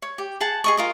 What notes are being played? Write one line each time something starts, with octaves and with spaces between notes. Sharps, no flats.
C#5
G4
G#4 F#5 A5
G#4 D#5 C#6
F4 A#4 D#5